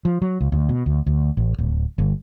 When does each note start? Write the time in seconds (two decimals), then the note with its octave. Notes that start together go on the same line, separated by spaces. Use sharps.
0.05 F3
0.22 F#3
0.41 C#2
0.52 D2
0.69 B2
0.86 D2
1.07 D2
1.37 A1
1.58 D1
1.98 G1